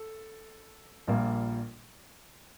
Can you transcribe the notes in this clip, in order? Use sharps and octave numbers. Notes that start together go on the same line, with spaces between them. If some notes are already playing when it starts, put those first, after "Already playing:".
Already playing: A4
A#1 A#2 G3 A#3